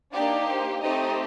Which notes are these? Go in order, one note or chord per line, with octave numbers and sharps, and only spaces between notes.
A#3 D4 D#4 G4 D5
C5
A3 C4 D#4 G4 D#5